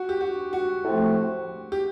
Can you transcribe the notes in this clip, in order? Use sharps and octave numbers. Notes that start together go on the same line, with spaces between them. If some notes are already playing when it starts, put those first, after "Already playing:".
Already playing: F#4
G4
F#4
F#4
A2 F3 A3 C4
G4